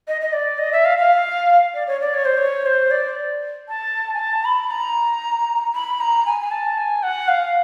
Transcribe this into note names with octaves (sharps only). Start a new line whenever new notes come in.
D#5
D#5
D5
D#5
E5
F5
F5
D5
C#5
D5
C#5
C5
C#5
C5
D5
A5
G#5
A5
B5
A#5
B5
A#5
G#5
G#5
A5
G#5
F#5
F5